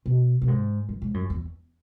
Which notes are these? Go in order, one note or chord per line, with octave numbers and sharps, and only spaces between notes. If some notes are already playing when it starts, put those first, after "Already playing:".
B2
B2
G#2
F#2
G#2
F#2
E2